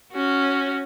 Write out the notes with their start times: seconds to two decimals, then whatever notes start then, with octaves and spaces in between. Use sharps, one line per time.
0.13 C#4 F#4